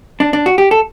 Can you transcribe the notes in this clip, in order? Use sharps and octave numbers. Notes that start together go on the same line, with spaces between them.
D4
D4
F#4
G4
A4